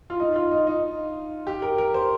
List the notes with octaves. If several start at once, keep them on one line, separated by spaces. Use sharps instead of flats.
F4
D#4
F4
D#4
D#4
G4
A#4
A#4
C5